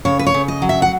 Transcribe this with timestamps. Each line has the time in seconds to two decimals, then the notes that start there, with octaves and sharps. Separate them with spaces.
0.05 C#3 C#5
0.19 B4
0.27 C#5
0.34 C#3
0.48 D#5
0.62 F#3
0.69 E5
0.82 F#5